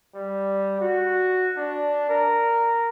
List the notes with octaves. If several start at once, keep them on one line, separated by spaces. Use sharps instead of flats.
G3
F#4
D4
A#4